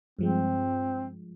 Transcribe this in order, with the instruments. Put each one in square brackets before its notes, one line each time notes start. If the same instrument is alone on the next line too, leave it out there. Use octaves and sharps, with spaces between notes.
[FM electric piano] G2 F3 G#3 [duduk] C4